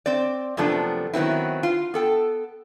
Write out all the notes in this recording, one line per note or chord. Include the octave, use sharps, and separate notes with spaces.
C4 D5
F#2 C3 F3 A3 B3 D4
D#3 F#3 B3 C4 E4
F4
B3 A4 G5